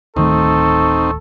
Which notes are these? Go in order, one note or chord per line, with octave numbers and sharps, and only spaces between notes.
D1 D#3 A3 C4 D#4 A4 C#6